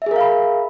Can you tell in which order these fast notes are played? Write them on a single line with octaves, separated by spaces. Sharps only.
E5 G#4 A#4 F5 B5